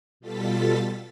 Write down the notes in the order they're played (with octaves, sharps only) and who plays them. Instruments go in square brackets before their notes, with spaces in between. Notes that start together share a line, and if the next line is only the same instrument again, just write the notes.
[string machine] B2 G3 F4 A4 A6 B6